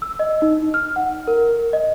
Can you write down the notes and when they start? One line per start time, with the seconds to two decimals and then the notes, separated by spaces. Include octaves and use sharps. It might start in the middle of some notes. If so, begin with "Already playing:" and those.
0.02 E6
0.19 D#5
0.42 D#4
0.74 F6
0.96 F#5
1.28 A#4
1.73 D#5